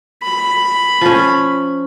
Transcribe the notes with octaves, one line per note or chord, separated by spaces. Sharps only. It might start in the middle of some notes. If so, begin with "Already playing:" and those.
B5
F3 C#4